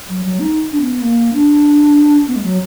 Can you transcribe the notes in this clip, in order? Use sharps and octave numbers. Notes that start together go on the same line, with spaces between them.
F#3
F#3
D#4
D4
B3
A#3
D4
B3
G#3
F#3